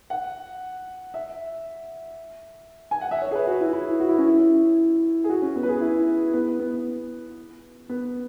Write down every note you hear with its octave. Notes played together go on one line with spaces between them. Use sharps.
F#5
E5
G#5
F#5
E5
C#5
G#4
B4
F#4
E4
E4
F#4
E4
C#4
E4
G#4
F#4
C#4
B3
B4
G#4
E4
B3
B3
B3